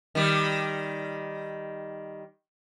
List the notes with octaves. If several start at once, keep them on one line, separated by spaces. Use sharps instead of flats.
D#3 G3